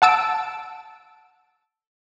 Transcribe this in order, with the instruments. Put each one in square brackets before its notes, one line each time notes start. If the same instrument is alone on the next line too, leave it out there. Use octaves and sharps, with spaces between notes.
[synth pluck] F#5 A5 E6 D7